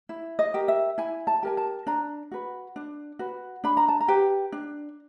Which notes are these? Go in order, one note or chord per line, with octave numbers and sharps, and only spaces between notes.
E4
D#5
G4 A#4
E5
E4 G#5
A5
G4 A#4 G#5
A5
D4 A#5
F#4 B4
D4
F#4 B4
D4 B5
A#5
A5
A#5
G4 B4
D4